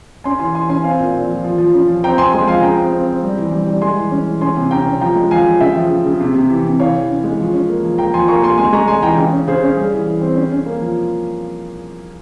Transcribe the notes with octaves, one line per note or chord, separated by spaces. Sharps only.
C#4 G#5 C6
E3 G#5 C6
E3 G#5 C6
C#4 G#5 C6
C4 F5 G#5
A#2
A#2
F3
F3
F3
C#4
F3
C4 G5 A#5
C4 G#5 C6
G#3 G#5 C6
F3 F5 G#5
C#3 G5 A#5
C4
C4
C4
G3
E3
G3
G3
G#3 G#5 C6
E3
C#4
E3
C#4 G#5 C6
C3
C#4 G5 A#5
C#4
F3 G5 A#5
G#3
F3 F5 G#5
F3
C#3 E5 G5
F3
C#3
C#3
C3
C3
E3
C3
E3 C#5 F5
E3
C#4
G#3
F3
C#4
A#3
F3
A#3 G5 A#5
F3 G#5 C6
A#3 A#5 C#6
A#3 G#5 C6
G#3 G#5 C6
G#3 A#5 C#6
G#3 G#5 C6
E3 G5 A#5
C#3
C#4
C#3 G#4 C5
C#4
G3 G#4
E3
E3
C4
C#4
C#4
A#3
F3